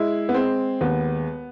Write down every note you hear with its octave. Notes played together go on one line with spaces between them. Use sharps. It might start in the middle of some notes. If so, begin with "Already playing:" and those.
Already playing: G#3 E4
B3
G#3 C4
D#2 B3